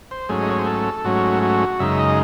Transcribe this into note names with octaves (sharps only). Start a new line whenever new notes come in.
C5
G#2 F#3 A3 C#4 G#4
D#5
C#5
C5
A4
G#2 F#3 A3 C#4 F#4
F#4
F#2 C#3 G#3 D#4 E5
D#5